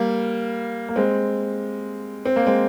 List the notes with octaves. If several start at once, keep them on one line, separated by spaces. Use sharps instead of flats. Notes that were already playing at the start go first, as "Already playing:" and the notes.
Already playing: G3 A#3
A#3
G#3 C4
C4
A#3
G#3 C4